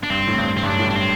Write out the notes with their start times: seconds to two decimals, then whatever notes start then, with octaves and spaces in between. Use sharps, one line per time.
0.03 D4
0.10 G2 C4
0.27 A2
0.38 G2
0.57 C4
0.63 G2
0.68 F#2 D4
0.79 A2
0.87 G2 D4
0.96 C4